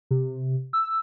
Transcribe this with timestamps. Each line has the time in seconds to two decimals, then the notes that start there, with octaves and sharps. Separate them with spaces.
0.11 C3
0.73 E6